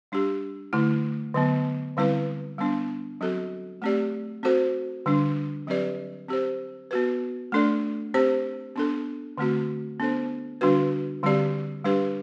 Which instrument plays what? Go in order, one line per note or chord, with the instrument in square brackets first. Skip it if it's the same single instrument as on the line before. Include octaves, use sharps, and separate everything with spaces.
[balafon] G3 D4 G4
D3 A3 E4
D3 F#3 B3
D3 G3 C4 E4 B4
G3 B3 D4
F#3 C4 F#4 A4
A3 C4 G4 D5
C4 F#4 A4 C5
D3 G3 D4
F#3 C4 G4 B4 D5
C4 G4 C5
B3 F#4 B4
A3 D4 A4 D5
C4 G4 C5
B3 D4 A4
D3 A3 C4 F#4
B3 D4 A4 C5
D3 G3 D4 F#4 B4
D3 G3 C4 G4 D5
G3 D4 G4 B4